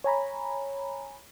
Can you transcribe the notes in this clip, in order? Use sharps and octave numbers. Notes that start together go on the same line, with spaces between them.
C#5 G#5 A#5 B5